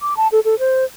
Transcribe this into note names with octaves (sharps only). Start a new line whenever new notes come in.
D6
A5
A4
A4
C5